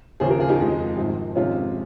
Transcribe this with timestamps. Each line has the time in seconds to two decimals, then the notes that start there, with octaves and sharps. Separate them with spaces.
0.20 D#2 C#3 F3 A#3 G#4 C5
0.30 G4 A#4
0.39 F4 G#4
0.49 D#4 G4
0.59 F2 D#3 G#3
0.97 G#1 G#2 F3
1.35 F2 C3 D#3 G#3 C#4 F4